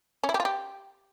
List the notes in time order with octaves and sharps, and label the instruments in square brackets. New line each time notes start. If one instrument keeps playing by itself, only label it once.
[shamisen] C#4
E4
G4
F4
G4